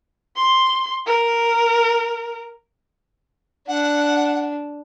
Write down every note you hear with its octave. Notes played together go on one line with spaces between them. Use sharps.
C6
A#4
D4 F#5